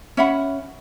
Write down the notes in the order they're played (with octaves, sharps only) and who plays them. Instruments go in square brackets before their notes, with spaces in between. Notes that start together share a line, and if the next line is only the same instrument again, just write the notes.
[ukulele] C#4 E5 F#5 B5